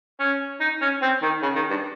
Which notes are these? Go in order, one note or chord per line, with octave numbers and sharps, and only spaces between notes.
C#4
D#4
C#4
C4
D#3
C#3
D#3
G2